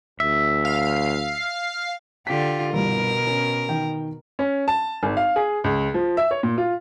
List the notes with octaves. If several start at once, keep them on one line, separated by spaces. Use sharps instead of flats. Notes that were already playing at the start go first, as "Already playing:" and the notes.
D2 E5
F5
D3 F4 G4 B6
G1 C2 B2 A#4
C#4
D#3 G5
C#4
A5
G#1
F5
G#4
C#2
F3
E5
C#5
A#2
F4